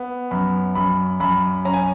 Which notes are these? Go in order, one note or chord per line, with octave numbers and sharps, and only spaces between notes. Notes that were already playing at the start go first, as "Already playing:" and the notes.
Already playing: B3
F#2 B5
F#2 B5
F#2 B5
C#4 A#5
G#5